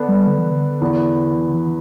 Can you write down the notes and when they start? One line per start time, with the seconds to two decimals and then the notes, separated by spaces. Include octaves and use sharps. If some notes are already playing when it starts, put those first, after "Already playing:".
Already playing: D3 B3 D4
0.08 G3
0.27 D3
0.38 E3
0.51 D3
0.81 E2 E3 B3
1.36 E3
1.48 D3
1.54 E3